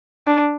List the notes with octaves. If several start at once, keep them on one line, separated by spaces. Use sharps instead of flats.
D4